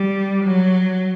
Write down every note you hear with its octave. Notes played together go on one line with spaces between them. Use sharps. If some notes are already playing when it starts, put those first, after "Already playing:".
Already playing: G3
F#3